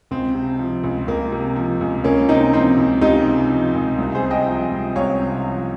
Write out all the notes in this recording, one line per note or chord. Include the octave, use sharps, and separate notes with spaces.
C#2 C4
C3
F3
C#2
C#2 A#3
C3
F3
C#2
C#2 A#3 C#4
C3 C4 D#4
F3 C4 D#4
C#2
C#2 D#4 G4
C3
F3
C#2
C2
G#4 C5
C3
D#5 G5
F3
C2
C2 C#5 F5
C3
F3